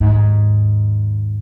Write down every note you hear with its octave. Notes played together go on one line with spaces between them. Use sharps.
D#2 G#2